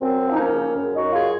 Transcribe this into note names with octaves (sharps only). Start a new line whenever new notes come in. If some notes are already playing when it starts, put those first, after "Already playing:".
F#2 C4
F3
D#4
A#3 C#4
C#3
F#2
D#4 F#4
F#2
F4 G#4